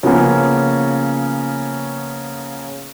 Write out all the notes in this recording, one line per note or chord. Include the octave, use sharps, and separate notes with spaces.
C#3 F3 A#3 B3 C#4